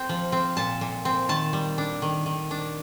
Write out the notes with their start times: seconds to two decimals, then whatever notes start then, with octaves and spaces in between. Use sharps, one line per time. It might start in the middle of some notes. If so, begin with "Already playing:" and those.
Already playing: C4 G5
0.09 F3
0.32 C4
0.57 A#2 A5
0.81 A#2
1.05 C4
1.29 D#3 A5
1.53 G3
1.78 D4
2.02 D#3
2.26 D#3
2.51 D4